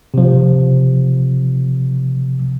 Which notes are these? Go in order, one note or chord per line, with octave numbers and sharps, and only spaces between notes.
C3 F3